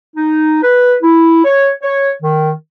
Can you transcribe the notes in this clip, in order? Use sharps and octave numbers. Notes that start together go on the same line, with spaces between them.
D#4
B4
E4
C#5
C#5
D#3